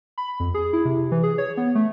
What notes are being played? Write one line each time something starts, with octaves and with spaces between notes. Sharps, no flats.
B5
F2
G#4
E4
C3
E3
G#4
C#5
B3
A3